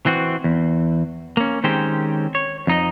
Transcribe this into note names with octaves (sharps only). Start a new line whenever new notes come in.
E3 C4 F#4
E2
A#3 C#4
D#3 G#3 C4 C#4 G4 C5
C#5
F2 D#4 D#5